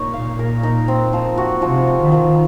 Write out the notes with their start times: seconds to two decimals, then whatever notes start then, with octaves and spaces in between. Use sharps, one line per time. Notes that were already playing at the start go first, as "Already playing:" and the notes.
Already playing: A#2 D#4 C#5
0.13 F5
0.39 A#4
0.63 D#4
0.88 C4
1.13 F3
1.38 F#4
1.62 C3 F3
1.87 C4
2.00 D#3
2.12 F3